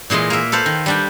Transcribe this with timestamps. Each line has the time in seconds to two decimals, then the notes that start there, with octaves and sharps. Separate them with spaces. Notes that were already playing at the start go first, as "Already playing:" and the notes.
0.10 A#2 E3 G#3 D#5 C6
0.30 A#3 E5
0.52 A4 B4 C5 F5
0.66 D#3
0.86 G3 D4 G5